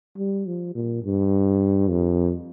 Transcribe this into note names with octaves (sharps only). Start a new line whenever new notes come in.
G3
F3
A#2
G2
F2